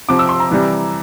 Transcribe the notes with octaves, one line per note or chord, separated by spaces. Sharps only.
C3 F3 D6
E6
C6
A#5
C3 E3 G3